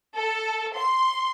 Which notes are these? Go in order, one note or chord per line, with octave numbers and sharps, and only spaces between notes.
A4
C6